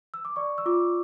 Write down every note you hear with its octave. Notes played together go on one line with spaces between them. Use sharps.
E6
D6
D5 C#6
E6
F4 D6